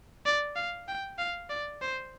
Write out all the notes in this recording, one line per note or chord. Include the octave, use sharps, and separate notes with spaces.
D5
F5
G5
F5
D5
C5